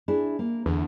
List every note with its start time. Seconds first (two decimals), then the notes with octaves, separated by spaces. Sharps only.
0.08 D4 E4 G#4
0.39 A#3
0.66 E2 D3